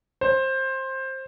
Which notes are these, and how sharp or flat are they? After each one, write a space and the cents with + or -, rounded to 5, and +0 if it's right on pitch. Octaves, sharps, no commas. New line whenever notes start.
C5 +15